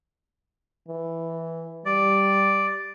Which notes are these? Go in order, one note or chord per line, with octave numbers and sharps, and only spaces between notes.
E3
G3 D5